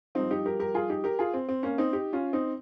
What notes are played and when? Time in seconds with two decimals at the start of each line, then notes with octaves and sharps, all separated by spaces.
0.15 G2 F3 C4 D#4
0.31 D#4 G4
0.46 G4 A#4
0.60 G4 A#4
0.74 F4 G#4
0.90 D#4 G4
1.04 G4 A#4
1.19 F4 G#4
1.34 C4
1.49 C4
1.63 A#3 C#4
1.78 C4 D#4
1.93 D#4 G4
2.13 C#4 F4
2.33 C4 D#4